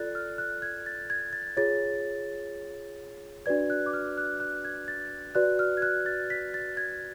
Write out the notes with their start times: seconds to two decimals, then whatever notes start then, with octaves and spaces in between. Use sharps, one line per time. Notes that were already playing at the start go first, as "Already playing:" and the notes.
Already playing: F4 A4 D5 F#6 A6
0.15 F6
0.38 F#6
0.62 G#6
0.86 A6
1.10 G#6
1.33 A6
1.57 F4 G#4 C#5 A6
3.46 D4 F#4 B4 D5 G#6
3.70 F#6
3.86 D6
3.93 F6
4.18 F#6
4.40 F#6
4.64 G#6
4.88 A6
5.35 F#4 B4 D5 F#6
5.59 F6
5.77 G#6
5.82 F#6
6.06 A6
6.30 B6
6.54 A6
6.77 G#6